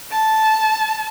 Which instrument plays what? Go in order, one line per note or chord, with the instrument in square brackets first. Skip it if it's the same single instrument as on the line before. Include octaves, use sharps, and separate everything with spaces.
[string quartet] A5